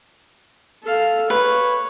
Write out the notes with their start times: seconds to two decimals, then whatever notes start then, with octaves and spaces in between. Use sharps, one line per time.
0.83 A4 F5
1.30 B4 C#5